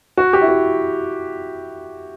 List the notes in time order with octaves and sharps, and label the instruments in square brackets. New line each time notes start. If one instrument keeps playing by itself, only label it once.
[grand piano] F#4
G4
E4
F#4